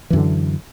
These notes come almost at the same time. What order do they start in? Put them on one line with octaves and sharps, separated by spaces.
E3 F#2 D3